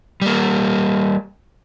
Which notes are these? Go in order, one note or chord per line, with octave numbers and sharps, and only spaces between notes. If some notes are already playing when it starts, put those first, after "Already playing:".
G3 A#3